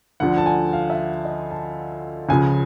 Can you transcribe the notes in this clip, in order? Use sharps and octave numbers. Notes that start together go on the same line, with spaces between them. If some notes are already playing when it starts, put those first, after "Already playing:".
D2 D3 F3 F#5
A5
G#5
F5
E5
D#5
A5
C#2 C#3 F3 G#5